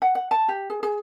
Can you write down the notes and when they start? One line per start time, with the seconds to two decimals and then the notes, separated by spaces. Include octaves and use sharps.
0.02 F#5
0.15 F#5
0.31 A5
0.48 G4
0.70 G#4
0.83 G#4